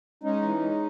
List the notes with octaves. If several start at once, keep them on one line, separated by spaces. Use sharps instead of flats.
G#3 C#4 D#4
E3
G#3